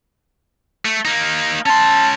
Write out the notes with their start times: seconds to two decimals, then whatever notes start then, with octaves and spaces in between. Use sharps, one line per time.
0.85 A3
1.05 A#3 D#4
1.66 C#4 A5 C6